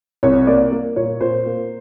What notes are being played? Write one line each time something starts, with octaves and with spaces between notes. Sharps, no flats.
C2 C#5
A#3 D5
A#3
A#2 C#5
A#2 C5
A#3